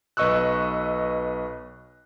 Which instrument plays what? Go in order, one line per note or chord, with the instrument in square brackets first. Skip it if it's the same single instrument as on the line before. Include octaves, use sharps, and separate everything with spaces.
[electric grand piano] B1 B4 D#5 C#6 E6 F#6